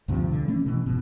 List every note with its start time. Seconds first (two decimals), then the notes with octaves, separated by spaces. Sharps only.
0.08 D2 G2 C3 F3
0.29 D3
0.48 E3 A3 C#4
0.66 B2 E3
0.86 F#1 G#2 B2